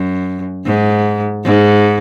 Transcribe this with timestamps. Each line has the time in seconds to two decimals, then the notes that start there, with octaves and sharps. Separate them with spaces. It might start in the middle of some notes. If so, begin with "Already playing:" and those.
Already playing: F#2
0.66 G#2
1.45 G#2